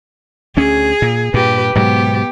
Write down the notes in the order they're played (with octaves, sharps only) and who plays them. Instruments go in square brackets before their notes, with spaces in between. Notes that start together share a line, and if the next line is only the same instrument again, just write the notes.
[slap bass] D2 C#4 [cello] G#4
[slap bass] A#2
[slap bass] G2 A#2 [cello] G4 B4
[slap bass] G#2 B2 F#3 [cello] B3 G4